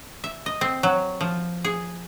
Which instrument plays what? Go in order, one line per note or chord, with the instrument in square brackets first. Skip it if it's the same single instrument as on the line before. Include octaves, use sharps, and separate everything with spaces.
[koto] E5
D#5
C4
F#3
F3
G#4